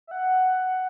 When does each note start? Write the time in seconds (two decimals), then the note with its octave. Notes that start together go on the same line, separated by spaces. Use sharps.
0.07 E5
0.11 F#5